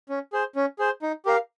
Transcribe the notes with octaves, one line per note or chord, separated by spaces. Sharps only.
C#4
G#4 C5
C#4
G#4 C5
D#4
G4 A#4 F5